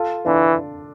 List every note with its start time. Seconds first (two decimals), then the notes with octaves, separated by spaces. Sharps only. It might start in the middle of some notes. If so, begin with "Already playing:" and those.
Already playing: F4 A4
0.26 E3 D4 F4